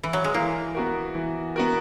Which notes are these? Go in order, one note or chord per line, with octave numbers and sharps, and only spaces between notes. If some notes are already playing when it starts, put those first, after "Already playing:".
E3
F#3
G#3
E3 A#3
B3 F#4 A#4
E3
B3 F#4 A#4